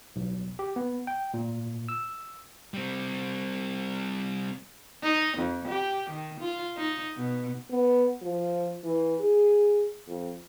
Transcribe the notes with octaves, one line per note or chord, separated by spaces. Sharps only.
B1
G4
B3
G5
A#2
E6
G3 C4
D#4
F2
G4
D#3
F4
D#4
B2
B3
F3
E3
G#4
F2